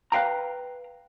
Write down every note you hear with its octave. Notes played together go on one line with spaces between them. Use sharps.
B4 F5 G5 A#5